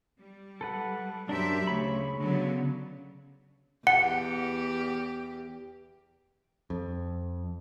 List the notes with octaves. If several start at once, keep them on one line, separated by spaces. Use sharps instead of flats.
G3
A4 B4 F#5
F#2 D4 G4 A#4 C5 E5
D2 C#3 C#5 B5
D3 F#3 B3
E2 G4 F#5
F2